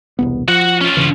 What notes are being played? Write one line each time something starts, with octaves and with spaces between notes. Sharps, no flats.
E1 C2 B3
F3 F#4 F#5
C#4 F4
G1 C#3 E3